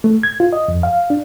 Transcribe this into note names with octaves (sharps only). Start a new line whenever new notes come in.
A3
G#6
F4
D#5
F2
F5
D4